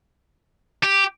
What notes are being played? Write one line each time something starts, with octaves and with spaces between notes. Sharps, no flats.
G4